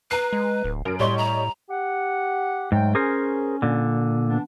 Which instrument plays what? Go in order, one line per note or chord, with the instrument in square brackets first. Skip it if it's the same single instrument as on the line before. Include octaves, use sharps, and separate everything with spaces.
[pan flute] B4 [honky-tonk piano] A#5 C7
[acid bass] G#3
D1
[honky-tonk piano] F#2 D7 [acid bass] A#4
[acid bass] A2 [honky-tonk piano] G3 C#5 D#5 [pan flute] C6
[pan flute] A#5
[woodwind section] G4 F#5
[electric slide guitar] G#2 [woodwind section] F#3 A3 G5
[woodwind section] C#4 [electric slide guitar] G#4 A#4 C5
[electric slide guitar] A#2 D3
[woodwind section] E3 B3 D4